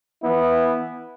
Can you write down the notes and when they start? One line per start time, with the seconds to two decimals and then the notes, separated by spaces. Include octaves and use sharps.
0.22 E3 B3 E4